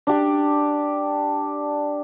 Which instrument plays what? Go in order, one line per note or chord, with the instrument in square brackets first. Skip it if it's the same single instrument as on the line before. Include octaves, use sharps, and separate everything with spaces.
[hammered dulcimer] D4 G4